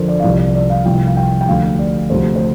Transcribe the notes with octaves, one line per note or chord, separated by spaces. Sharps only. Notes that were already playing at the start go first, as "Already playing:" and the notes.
Already playing: F2 D3 F3 A#4 C5
D5
F5
C2 C3 F3 D5
D5
D5
F5
C2 C3 F3 G5
F5
G5
G5
D2 D3 F3 F5
D5
D2 C3 F3 C5
C5